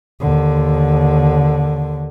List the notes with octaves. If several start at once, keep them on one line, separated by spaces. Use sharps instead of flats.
D#2 D3